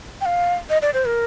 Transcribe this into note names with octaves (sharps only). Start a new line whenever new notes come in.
G5
F5
D#5
D5
C5
A#4